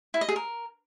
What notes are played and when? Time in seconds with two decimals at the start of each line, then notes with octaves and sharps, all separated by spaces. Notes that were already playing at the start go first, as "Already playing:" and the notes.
0.14 E4
0.21 D#5
0.29 G#4
0.36 A#4